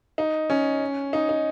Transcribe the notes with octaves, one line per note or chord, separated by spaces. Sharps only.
D#4
C#4
D#4
D#4